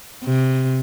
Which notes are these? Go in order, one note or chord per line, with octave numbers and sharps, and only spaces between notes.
C3